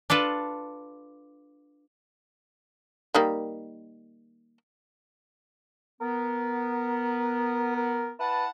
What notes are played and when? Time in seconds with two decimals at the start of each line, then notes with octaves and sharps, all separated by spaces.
0.10 D4 F4 A4 B4
3.15 D#3 G3 A#3
6.01 B3 A#4
7.77 A#4
8.20 E4 B4 F#5 A5